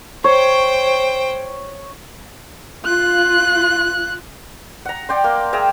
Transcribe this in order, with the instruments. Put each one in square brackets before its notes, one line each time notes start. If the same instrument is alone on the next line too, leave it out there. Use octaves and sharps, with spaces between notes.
[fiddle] C5 G5 [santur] C#5
[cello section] F4 [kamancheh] F#6
[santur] F#5 A#5
D5 G5 C6
A#3
G#4 E5 G5 A#5